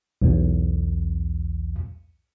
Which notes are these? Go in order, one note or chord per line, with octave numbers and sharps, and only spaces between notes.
B1 E2